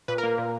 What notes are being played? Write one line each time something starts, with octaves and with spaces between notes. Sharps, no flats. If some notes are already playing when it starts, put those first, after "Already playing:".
A#2 B4
A#4
A#3
A#2